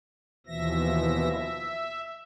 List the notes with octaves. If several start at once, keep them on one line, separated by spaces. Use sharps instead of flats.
D#2 B2 E3 F3 E5 A#6
E5